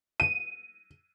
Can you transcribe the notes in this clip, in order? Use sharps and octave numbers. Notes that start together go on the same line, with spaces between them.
D#7